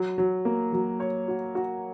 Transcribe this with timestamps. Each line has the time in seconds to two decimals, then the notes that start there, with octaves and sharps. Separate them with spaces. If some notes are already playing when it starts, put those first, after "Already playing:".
Already playing: F#3
0.18 F#3
0.45 A#3
0.73 F#3
1.00 C#5
1.28 F#4
1.55 F#4